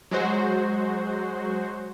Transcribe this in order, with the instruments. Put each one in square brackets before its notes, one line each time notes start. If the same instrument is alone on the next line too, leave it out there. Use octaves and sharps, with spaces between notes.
[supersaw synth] F#3 G#3 F#4 C5